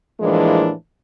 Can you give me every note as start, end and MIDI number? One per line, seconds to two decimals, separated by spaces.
0.20 0.72 45
0.20 0.72 52
0.20 0.72 53
0.20 0.72 56
0.20 0.72 58
0.20 0.72 62